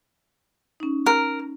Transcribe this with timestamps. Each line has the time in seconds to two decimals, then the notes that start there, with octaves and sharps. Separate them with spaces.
0.80 C#4 D#4
1.06 A#4